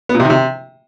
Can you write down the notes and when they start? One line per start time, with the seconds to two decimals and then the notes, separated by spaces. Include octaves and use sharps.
0.09 B3
0.14 A#2
0.20 C3
0.25 D#3
0.30 C3